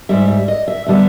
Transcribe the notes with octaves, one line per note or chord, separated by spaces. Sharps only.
G#2 D#3 G3 E5
E5
D#5
E5
D3 G3 B3 E5